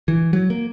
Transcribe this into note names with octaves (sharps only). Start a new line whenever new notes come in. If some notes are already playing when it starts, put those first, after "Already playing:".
E3
F#3
A#3